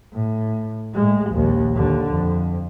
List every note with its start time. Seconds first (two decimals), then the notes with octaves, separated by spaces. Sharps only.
0.14 A2
0.94 A2 G#3
1.31 A#1 D#2
1.75 D#2 D3
2.13 F2